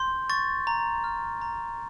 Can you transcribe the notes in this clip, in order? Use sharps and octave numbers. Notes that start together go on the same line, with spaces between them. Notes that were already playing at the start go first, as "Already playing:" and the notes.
Already playing: C6 G6
C#6 A6
A#5
F6
A#5